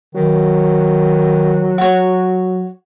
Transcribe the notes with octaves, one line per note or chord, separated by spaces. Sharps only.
D#3 F#3
F#4 C#5